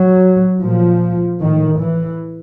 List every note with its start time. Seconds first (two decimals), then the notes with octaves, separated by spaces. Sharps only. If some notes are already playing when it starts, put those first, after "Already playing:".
Already playing: F#3
0.62 A#2 F3
1.41 A2 D#3
1.81 E3